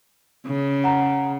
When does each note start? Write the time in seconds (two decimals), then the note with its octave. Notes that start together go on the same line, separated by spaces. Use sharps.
0.46 C#3
0.84 F#5 A#5